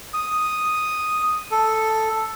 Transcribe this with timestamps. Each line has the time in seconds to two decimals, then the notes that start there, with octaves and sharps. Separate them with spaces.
0.14 D#6
1.51 A4